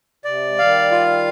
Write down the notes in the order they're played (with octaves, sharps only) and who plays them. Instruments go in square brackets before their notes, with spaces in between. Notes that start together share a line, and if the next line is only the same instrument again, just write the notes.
[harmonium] C3 [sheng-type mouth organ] D5
[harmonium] G#3
[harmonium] D#3 G3 [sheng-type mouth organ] F5
[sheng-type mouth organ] F4